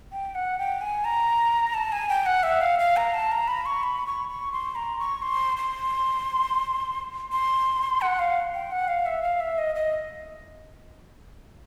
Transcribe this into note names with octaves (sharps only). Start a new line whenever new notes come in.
G5
F#5
G5
G#5
A#5
A5
G#5
G5
F#5
E5
F5
F5
A#5
A5
A#5
B5
C#6
B5
C#6
C#6
C6
A#5
C#6
C6
C6
C6
F#5
F5
G5
F#5
F5
E5
F5
E5
D#5
D#5